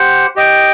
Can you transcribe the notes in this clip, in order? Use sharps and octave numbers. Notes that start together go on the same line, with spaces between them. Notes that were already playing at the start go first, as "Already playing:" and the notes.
Already playing: G4 C5 F#5
G4 D#5 G5